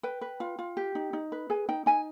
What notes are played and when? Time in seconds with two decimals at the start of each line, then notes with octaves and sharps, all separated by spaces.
0.03 B4 G5
0.21 B4
0.40 F4
0.59 F4
0.77 G4
0.95 D#4
1.13 D#4
1.32 B4
1.50 G#4 G#5
1.69 D#4 G5
1.86 D#4 G#5